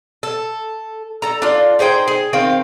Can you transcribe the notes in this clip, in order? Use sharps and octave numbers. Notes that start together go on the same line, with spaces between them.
A4
A4 A#5
D4 F4
D#4 G#4 C5 G5
G#4
D#3 C4 F5 G5